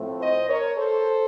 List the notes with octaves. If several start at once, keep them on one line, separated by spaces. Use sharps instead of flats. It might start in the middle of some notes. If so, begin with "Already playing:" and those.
Already playing: A2 F3 A3 C4
C5 D#5
A#4 C#5
A4 C5